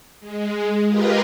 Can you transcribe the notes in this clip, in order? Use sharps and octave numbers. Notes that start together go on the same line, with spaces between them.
G#3
F4 G4 G#4 A#4 B4 D#5